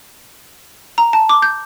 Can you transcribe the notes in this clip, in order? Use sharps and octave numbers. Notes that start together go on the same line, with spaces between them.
A#5
A5
D6
G6